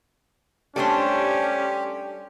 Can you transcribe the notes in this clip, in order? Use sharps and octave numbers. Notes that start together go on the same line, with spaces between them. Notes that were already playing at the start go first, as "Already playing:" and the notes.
G3 A3 C#4 D4 G4 A4 C5